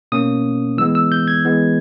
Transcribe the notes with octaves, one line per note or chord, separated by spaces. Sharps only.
B2 A#3 C#4 D#6
E3 G#3 B3 E6
E6
G6
G#6
E3 G#3 B3